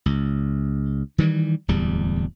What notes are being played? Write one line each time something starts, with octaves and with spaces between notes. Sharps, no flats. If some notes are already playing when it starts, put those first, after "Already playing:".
C#2
D#3 E3 G3
D1 E2 G3